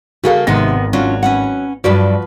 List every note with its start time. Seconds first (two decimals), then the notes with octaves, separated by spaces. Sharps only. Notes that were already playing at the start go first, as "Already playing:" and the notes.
0.24 C#3 G3 A#3 F#4 G#4 A4 F5
0.47 G#1 C3 D#3 G#3 B3 D#4 A#6
0.93 F#3 C#4 D4 F4
1.23 C#4 B4 F#5
1.84 G2 F3 F#3 F#4 B4 D5